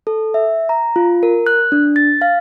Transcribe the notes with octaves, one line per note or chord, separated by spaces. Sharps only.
A4
E5
A#5
F4
A#4
F#6
D4
A6
F5